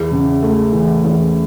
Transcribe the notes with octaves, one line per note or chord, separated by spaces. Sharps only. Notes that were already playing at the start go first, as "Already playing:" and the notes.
Already playing: E2
C#3
A3
E3
E2